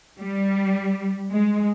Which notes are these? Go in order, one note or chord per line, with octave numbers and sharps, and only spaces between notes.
G3
G#3